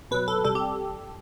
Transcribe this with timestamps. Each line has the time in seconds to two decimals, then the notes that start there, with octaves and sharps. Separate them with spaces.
0.11 B2 F#3 B4
0.28 A4
0.44 C3 G3 A4
0.55 G4